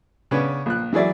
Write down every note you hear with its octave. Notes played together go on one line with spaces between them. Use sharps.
C#3 B3 C#4 D4
A#1 F#6
E3 F#3 G#4 D5 E5